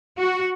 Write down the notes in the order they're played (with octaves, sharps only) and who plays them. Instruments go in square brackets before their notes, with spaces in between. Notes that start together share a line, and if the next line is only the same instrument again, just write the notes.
[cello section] F#4